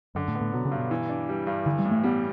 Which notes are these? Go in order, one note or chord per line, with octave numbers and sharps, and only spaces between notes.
F#2 D3
A2
B3
A2
B2 F#3
C#3
G2
B2
E3
D4
G3
G2
D3 E3
G3
A2
A3
G3 B3